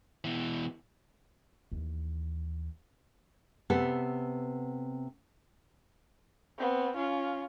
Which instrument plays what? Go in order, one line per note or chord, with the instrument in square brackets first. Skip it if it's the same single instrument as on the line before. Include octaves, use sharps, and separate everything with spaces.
[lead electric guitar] B2 E3
[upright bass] D#2 E3
[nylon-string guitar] C3 B3 A4
[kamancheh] B3 C4
C#4 F4